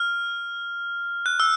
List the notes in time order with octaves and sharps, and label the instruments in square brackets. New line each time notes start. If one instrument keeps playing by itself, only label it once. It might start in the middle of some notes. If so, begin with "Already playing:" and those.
Already playing: [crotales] F6
F#6
E6